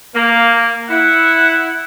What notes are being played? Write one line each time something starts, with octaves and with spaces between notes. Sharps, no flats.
A#3
E4 F#5